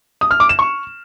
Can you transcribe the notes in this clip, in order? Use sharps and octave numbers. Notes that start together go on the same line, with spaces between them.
D#6
F6
D6
E7
C#6